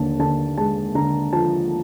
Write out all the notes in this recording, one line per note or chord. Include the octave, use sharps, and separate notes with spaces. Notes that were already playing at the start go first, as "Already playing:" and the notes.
Already playing: D#2 D3 A5
D3 A5
G#3 A5
D3 A#5
F3 A5